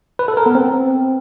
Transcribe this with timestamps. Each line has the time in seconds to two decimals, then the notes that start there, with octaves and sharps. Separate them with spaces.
0.19 B4
0.28 A4
0.37 A#4
0.46 B3
0.55 C4